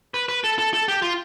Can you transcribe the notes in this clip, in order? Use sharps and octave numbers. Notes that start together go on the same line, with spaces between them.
B4
B4
A4
A4
A4
G4
F4